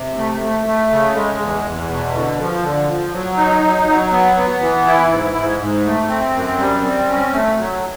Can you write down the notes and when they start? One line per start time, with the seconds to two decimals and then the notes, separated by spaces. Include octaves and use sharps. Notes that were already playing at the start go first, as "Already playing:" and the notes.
Already playing: C3
0.17 A3
0.41 A3
0.66 A3
0.90 C#3
1.14 G#3
1.39 E2
1.64 E2
1.89 B2
2.13 D3
2.38 F3
2.63 D3
2.88 F3
3.13 F#3
3.37 D#4
3.62 F#3
3.87 F#3
4.12 B3
4.36 B3
4.61 E3
4.86 E4
5.10 G#2
5.35 G#2
5.60 G#2
5.85 A3
6.08 C4
6.33 F#2
6.58 G3
6.83 C4
7.08 C#4
7.33 A3
7.57 F#3